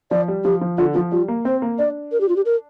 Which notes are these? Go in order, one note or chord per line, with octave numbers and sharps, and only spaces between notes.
F3 D5
G3
F3 G4
F3
D3 F4
F3 F4
G3 F4
A#3
C4 C5
A#3
D4 D5
A#4
G4
F4
G4
A#4